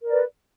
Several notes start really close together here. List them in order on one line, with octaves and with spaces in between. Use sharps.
A#4 D5 B4